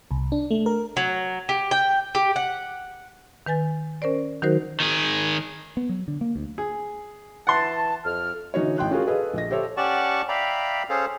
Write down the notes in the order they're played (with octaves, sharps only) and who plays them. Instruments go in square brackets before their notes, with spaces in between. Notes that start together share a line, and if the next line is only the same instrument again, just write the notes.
[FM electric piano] C2
D4
A3
A#4
[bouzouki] F#3
G4
G5
G4
F#5
[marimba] D#3 B4 G#5 A6
C#4 A#4 C5 D5
D#3 F#3 D#4 F#4 A#4 C5
[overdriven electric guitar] D#3 G#4
[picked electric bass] B3
F#3
D3
A#3
D2
[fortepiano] G#4
[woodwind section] E3 E5 A5 [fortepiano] F#5 C6
[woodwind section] F2 F6
[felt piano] D3 E3 D#4 F#4 C#5
A1 G5 C6 F#6
C#4 F4 F#4 G#4 A#4
G#4 A4 B4 D#5 F5
A#1 D#5 A#6
G4 A4 C5 C#5 E5
[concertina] C#4 G4 D5 F#5 A5 C#6
D5 E5 F5 G5 A#5 B5
C#4 G#4 A4 C5 F5